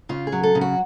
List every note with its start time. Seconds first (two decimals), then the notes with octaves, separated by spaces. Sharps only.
0.09 C#3 F4
0.27 G#4
0.32 F#3
0.43 A4
0.55 C#3
0.61 F#4